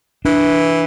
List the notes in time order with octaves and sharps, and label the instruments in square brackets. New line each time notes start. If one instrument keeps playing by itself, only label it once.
[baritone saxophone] E3 [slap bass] D4